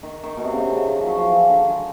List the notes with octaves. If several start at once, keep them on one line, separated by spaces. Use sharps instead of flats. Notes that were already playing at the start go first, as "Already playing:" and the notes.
D#3
D#3
B2
C3
C#3
C3
D3
C#3
D#3
F3
F#3
F3
E3
D#3
D3
D#3
G#3